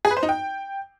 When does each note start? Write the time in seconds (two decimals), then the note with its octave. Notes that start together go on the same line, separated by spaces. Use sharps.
0.05 G#4
0.11 B4
0.17 C5
0.23 D#4
0.29 G5